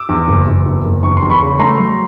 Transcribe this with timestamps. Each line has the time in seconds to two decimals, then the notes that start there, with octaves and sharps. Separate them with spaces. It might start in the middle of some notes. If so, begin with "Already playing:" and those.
Already playing: D6 E6
0.09 E2
0.28 F#1
0.47 F#1
0.66 E2
0.85 F#1
1.03 E2 C#6
1.17 C6
1.22 E2
1.30 B5 C#6
1.41 C#3
1.59 A3 A#5 C6
1.78 F#3